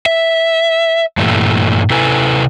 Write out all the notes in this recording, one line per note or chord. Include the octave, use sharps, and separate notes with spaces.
E5
G2 A#2 E3 G3 A3
C3 E4 A4 B4 G#5